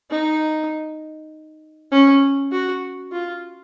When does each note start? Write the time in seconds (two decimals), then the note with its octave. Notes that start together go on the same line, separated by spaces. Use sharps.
0.10 D#4
1.92 C#4
2.52 F#4
3.12 F4